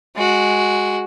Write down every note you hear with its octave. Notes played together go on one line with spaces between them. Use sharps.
G#3 F#4